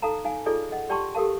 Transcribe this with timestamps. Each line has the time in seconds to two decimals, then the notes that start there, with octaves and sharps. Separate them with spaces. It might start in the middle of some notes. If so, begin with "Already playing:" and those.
0.02 D#4 A4 F5 A5 A#5
0.24 D#4 F5 G#5
0.46 D#4 F4 G#4 A4 D5 D#5
0.72 D#5 F#5
0.89 G4 D5 G5 A5 C6 C#6
1.15 G4 A4 A#4 F5 A5